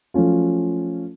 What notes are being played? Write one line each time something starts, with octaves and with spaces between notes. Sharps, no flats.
F3 F#3 A3 C#4 F4